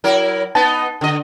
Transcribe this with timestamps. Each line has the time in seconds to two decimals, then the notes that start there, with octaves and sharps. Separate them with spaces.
0.04 F#3 E4 A#4
0.55 B3 D#4 A5 A6
1.01 D3 D#5